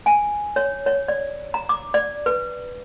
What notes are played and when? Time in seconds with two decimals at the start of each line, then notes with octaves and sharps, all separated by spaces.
0.06 G#5
0.56 C#5
0.86 C#5
1.08 D5
1.54 A#5
1.69 D6
1.94 D5
2.26 B4